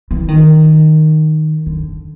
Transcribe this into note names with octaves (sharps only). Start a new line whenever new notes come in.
E3
D#3
D3